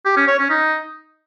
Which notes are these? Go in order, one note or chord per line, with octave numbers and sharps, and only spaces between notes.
G4
C#4
C#5
C#4
D#4